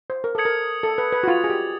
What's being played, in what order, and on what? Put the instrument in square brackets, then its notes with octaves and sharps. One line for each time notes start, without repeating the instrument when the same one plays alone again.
[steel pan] C5
A#4
[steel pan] A4 [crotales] D#6 G#6 C#7 F#7
[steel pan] A#4
A4
B4
B4
F#4
[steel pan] F4 [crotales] A6 C#7 F7
[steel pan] G#4
G4